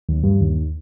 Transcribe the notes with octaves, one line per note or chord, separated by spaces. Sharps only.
D#2
G2
D#2